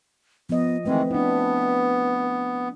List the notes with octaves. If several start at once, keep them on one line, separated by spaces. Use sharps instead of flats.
F3 B3 D#5
D#3 E3 G#3 A3 C4 B4
B3 D4 E4